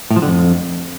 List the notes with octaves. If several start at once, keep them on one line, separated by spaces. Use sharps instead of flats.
A2
F3
D3
F2